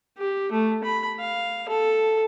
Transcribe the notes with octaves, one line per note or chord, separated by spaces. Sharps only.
G4
A3
B5
F5
A4